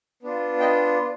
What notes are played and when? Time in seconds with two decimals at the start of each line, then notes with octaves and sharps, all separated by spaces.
0.23 B3 D4 F4
0.60 D#5 G5